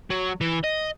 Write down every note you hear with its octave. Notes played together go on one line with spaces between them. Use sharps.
F#3
E3
D#5